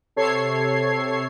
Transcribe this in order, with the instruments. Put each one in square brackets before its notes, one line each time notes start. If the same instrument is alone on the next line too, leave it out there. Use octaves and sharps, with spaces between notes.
[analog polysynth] C3 A4 C#5 G#6 C7